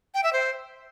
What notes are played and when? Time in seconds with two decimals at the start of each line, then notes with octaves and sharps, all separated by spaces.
0.14 G5
0.24 E5
0.33 C5